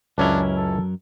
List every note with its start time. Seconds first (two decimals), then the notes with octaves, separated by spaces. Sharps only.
0.18 C#2 F#2 F#3 C#4 D4 E4 A#4
0.57 A4